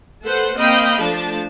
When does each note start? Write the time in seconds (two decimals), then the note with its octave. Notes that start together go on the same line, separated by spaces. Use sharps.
0.24 A3 A4 B4 C5 F#5
0.57 A#3 C4 D#5 F5 G5 B5
0.99 F3 A3 D4 A5